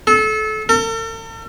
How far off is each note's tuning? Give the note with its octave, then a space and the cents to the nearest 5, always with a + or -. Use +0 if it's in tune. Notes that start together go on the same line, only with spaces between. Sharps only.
A4 -30
A4 +45